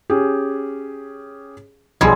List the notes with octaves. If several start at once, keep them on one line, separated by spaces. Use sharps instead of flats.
C#4 G4 G#4
B1 F3 G3 G#4 B5 C6 G#6